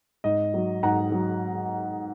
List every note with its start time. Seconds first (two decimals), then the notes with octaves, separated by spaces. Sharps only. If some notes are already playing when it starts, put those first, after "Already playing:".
0.24 G#2 D#5
0.54 F#3
0.83 G#2 F#5 A#5
1.12 F#3